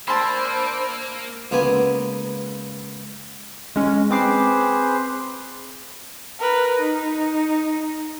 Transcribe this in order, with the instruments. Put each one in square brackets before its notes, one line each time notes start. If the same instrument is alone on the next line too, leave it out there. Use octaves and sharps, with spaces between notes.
[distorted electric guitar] A#3 [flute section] D4 C5 E6 [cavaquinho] A5 C6 [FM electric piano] B5
[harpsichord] C#2 A#3 B3 B4 G#5
[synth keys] G#3 C#4
[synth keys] C4 D6 C7 [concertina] G#4 B4 C5
[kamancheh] A#4 B4
D#4